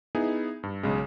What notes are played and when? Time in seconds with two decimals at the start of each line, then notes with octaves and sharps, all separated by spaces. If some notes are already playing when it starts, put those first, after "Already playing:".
0.15 B3 D#4 E4 G#4
0.63 G2
0.83 B1 C#3 G#3